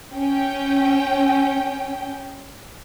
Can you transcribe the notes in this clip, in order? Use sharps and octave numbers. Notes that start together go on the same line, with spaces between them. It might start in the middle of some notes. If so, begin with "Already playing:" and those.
C#4 G5